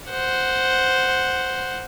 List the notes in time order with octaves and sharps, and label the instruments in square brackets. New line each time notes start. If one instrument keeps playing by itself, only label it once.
[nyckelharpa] C5 F#5